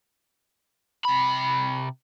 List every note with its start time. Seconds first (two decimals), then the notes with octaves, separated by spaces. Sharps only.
1.05 C3 B5